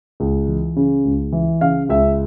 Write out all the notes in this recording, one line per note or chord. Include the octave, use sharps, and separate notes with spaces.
C#2
E3
C#3
C#2
E3
C#3 F5
C#2 E5